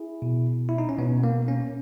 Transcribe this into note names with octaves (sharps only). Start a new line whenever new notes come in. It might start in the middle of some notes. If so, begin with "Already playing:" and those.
Already playing: E4 G#4
B2
E4
D#4
C#4
B2 B3
A#3
A#3 C#4